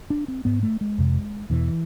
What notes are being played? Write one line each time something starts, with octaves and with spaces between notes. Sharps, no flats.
D4
C4
G#2 B3
A3
G#3
F2 C3
E2 B2 E3